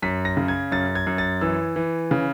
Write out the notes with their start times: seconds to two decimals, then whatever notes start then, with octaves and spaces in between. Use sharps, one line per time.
0.02 F#2 B6
0.25 A#6
0.37 C#3
0.48 G#6
0.72 F#2 A6
0.95 G#6
1.07 F#2
1.18 A6
1.41 E3 E6
1.76 E3
2.11 C#3